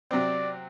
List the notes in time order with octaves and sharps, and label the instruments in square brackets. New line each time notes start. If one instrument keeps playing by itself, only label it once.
[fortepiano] C3 F#3 C4 [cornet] D5